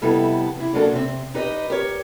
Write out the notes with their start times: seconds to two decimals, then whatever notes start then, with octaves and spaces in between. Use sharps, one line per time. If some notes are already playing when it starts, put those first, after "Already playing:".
0.02 F2 C3 G3 B3 E4 A4
0.57 C3 E4
0.73 F#3 G#3 A#3 D4 A4
0.91 C3 C4
1.34 D#4 G4 B4 D#5
1.70 G4 A#4 C#5